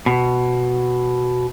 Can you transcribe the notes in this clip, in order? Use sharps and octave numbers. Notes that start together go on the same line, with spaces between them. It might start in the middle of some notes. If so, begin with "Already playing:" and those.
B2